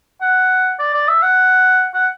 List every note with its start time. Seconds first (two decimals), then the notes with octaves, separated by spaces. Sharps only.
0.21 F#5
0.79 D5
0.94 D5
1.08 E5
1.22 F#5
1.94 F#5